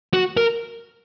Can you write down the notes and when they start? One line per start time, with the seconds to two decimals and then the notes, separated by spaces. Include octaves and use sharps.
0.14 F#4
0.37 A#4